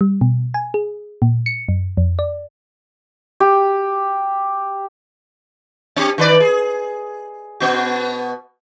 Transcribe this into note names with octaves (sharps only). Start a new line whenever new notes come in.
G3
B2
G#5
G#4
A#2
C#7
F#2
F2
D5
G4
C4 G4
D#3 B4 D5
G#4
B2 B3 F#4